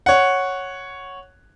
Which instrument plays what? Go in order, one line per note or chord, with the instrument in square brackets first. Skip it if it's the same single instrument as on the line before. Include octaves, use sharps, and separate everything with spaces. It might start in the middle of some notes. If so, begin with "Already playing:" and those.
[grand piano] C#5 F#5